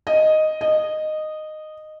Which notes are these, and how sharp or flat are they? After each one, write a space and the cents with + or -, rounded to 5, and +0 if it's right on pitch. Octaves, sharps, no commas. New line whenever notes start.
D#5 +0
D#5 -10